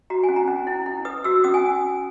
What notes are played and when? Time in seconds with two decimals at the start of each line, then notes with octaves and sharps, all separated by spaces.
0.10 F#4 A#5
0.23 G#5
0.29 C#4
0.36 A#5
0.48 C#4
0.67 E4
0.86 E4
1.05 B4 D#6
1.24 F#4 E6
1.44 C#4 D#6
1.54 G#5